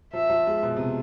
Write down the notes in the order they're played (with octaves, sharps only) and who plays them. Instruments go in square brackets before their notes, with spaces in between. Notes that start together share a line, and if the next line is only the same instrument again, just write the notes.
[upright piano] F3 [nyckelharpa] E5
[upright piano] F3
G#3
B2
C3